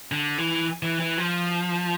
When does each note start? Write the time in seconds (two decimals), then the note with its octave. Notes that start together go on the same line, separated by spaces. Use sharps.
0.12 D3
0.38 E3
0.83 E3
1.00 E3
1.18 F3